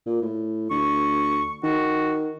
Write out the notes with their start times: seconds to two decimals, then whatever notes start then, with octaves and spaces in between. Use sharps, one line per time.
0.06 A#2
0.22 A2
0.70 D2 C#6
1.63 D#3 F#4